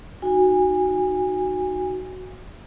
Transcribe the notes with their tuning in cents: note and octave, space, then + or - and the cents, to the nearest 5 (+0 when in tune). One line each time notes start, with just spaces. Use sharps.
D#4 +0 F#4 +0 G#5 -25